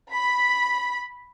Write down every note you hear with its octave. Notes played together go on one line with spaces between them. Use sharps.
B5